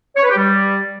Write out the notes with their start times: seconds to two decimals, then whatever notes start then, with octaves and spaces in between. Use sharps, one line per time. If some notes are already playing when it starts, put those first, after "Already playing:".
0.16 C#5
0.23 B4
0.30 G4
0.37 G3